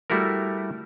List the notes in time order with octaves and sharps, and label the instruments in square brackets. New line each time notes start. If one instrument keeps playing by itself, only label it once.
[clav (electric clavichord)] G3 A3 E4 F#4 A#4